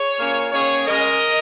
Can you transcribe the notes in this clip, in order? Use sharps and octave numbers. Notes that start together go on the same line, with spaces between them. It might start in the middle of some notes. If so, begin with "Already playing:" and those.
Already playing: G#4 C#5
A#2 A#3 C#4
D#3 A#3 C#4 G#4 C#5
C#3 G#3 C#4 A#4 D#5